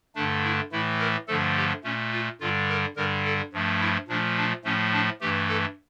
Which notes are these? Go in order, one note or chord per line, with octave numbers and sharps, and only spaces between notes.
G2 D3 A3 D4
E4
A2 E3 A3 E4
A#4
G2 D3 F3 A3 A4
G4
A#2 A3 C#4
F4
G2 D3 G3 F4
A#4
G2 D3 G3 A#4
A4
G2 F3 A3
E4
A#2 F3 A3 D4
D4
A2 F3 A3 C#4
D4
G2 E3 A3 G4
A4